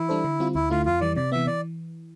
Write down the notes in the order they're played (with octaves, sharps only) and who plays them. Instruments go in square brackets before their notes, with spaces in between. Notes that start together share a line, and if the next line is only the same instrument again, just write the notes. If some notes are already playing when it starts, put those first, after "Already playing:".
Already playing: [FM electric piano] E3 [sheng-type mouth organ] E4
[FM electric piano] G3 D4 A4 C5
D3
G3 C4 F4
[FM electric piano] D2 [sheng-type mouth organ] E4
[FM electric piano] D3 A3 E4 [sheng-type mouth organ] F4
[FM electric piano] F2 [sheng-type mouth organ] F4
[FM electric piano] E3 G3 [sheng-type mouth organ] D5
[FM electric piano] C3 [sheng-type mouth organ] D5
[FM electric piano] E3 B3 [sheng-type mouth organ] E5
[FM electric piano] E3 [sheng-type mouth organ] D5